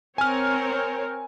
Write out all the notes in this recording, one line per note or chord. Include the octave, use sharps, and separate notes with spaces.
C4 A#4 C#5 G#5 F6